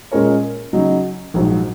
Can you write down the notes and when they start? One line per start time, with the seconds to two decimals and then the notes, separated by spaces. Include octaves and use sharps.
0.12 A#2 G#3 C#4 A#4 C#5
0.73 C#3 F#3 D#4
1.34 A#1 G#2 F#3